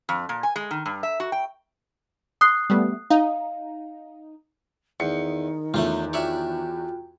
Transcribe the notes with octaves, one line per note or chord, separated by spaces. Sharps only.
F2
A#2
G#5
G#3
D#3
G2
E5
F#4
G5
C6 D#6 F#6 C7
G3 A3 B3
D#4 F5
E2 D#3 C#7
E2 A3 C#4 F4
F4 F#4 C#5 D5 E5 G5